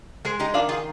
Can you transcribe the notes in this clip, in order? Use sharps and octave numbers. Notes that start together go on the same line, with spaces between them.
G#3 G#4 C5
D#4 G4
D#3 D4 F4
F4 G#4